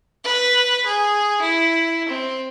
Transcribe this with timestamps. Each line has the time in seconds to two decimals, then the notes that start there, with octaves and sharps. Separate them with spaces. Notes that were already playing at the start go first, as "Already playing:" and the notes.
0.24 B4
0.86 G#4
1.41 E4
2.08 C4